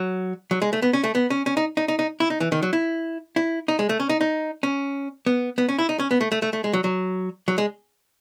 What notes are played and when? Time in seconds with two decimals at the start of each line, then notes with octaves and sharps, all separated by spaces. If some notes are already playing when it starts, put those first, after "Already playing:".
Already playing: F#3
0.51 F#3
0.62 G#3
0.73 A3
0.82 B3
0.93 C#4
1.04 A3
1.15 B3
1.30 C#4
1.46 C#4
1.57 D#4
1.77 D#4
1.88 D#4
1.99 D#4
2.20 E4
2.30 D#4
2.40 E3
2.52 D#3
2.62 F#3
2.73 E4
3.36 E4
3.68 D#4
3.79 G#3
3.89 A3
4.00 C#4
4.09 D#4
4.21 D#4
4.63 C#4
5.26 B3
5.58 B3
5.69 C#4
5.79 E4
5.89 D#4
6.00 C#4
6.11 B3
6.21 A3
6.32 A3
6.42 A3
6.53 A3
6.64 G#3
6.73 F#3
6.84 F#3
7.48 F#3
7.58 G#3